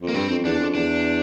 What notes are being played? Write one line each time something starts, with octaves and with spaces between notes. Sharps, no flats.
F2
A#3
G2 C4
F2
E2 D4
F2
E2 D4